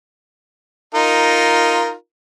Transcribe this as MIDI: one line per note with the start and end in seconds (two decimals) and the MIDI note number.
0.95 1.93 63
0.95 1.93 65
0.95 1.93 70